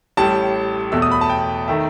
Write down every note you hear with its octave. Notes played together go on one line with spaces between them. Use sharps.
A1 A2 G3 A5
E2 B2 A3 E6
D#6
B5
A5
G5
D#3 A3 E5